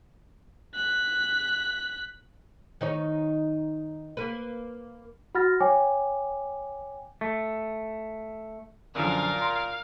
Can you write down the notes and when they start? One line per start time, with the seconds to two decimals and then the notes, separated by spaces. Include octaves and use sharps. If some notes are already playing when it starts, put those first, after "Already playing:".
0.75 F#6 B6
2.81 D#3 D#4 C#5
4.17 A#3 B4
5.35 F#4 F#5 B5 F6 A6 A#6
5.60 C#5 G5 G#5 D6
7.21 A3
8.95 F#2 A#2 D3 F3 A#4 F5
9.38 A#5 C6